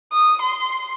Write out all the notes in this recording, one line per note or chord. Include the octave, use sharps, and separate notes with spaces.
D#6
C6